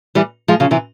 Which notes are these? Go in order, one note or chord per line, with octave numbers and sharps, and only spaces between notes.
E3 G3
F3 G#3
C#3 F3
C3 E3